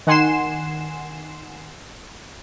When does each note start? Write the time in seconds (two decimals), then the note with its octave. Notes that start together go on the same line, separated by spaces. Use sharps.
0.07 D#3 F#5 G#5 C6 C7 E7